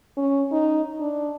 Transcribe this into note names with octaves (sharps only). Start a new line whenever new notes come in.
C#4
D#4
D4